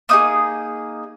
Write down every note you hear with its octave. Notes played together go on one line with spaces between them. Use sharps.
A#3 D#4 G#4 D#6